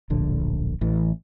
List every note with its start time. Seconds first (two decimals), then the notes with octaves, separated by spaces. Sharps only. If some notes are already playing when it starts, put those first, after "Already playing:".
0.10 D1 A#1 D3
0.81 A1 E3